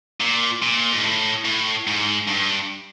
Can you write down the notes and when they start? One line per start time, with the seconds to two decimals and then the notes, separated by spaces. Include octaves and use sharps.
0.20 A#2
0.62 A#2
0.92 G#2
1.04 A2
1.45 A2
1.87 G#2
2.28 G2